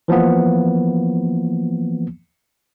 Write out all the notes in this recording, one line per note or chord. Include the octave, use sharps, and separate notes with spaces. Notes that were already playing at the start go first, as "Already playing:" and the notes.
E3 F3 A#3 B3